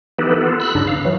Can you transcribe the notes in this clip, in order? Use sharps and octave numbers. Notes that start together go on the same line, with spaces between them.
E3 B3 D#4 G4 A4 B4
B3 F4 A4
B5 E6 F#6
G2 C#3 D4 D#4
F5
E3 F#3